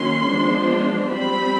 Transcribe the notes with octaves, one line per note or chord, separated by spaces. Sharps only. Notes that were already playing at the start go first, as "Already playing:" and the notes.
Already playing: D#3 F#3 A#3 C#4 C6
F3 G#3 B3 D4
G3 C4 B5